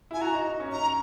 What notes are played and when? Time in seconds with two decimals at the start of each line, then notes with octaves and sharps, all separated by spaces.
0.11 E4 G#5
0.21 F#4 A#5
0.35 D#4
0.46 D#4
0.60 C#4
0.72 D#4 A#5